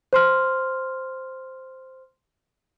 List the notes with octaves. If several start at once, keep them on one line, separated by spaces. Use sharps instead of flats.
C5 C6 F6